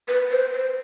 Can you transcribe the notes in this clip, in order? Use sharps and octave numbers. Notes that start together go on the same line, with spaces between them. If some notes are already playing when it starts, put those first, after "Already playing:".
B4
C5
C5